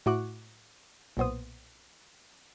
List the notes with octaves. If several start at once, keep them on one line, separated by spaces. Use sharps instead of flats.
A2 E4 F#4 C#6 D6 F#6
B1 A#2 B3 C5 D#6